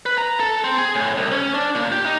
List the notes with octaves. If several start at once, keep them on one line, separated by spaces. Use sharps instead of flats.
B4
A#5
A4
C4
G#4
A2
C2
C#4
D4
A#2
G4
D#4